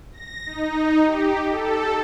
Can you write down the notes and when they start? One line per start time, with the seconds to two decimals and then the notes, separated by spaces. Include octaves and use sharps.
0.12 A#6
0.46 D#4
1.05 G4
1.49 A4